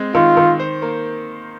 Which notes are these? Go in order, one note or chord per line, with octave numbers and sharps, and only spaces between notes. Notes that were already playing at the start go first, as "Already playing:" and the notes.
Already playing: G#3 C4
D#3 F4
D#3
C5
A#3